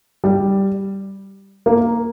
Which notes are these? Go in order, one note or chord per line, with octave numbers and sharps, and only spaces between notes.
G3
A#3